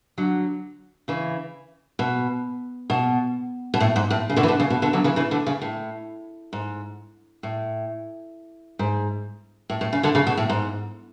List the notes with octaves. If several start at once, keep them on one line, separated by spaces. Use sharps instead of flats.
D3 F#3
C#3 E3
B2
B2
B2
A2
G#2
A2
C#3
B2 D3
E3
B2 D3
C#3
B2
B2 D3
D3 F#3
C#3 E3
C#3 E3
B2 D3
C#3
A2
G#2
A2
G#2
A2
A2
C#3
B2 D3
C#3
B2
A2
G#2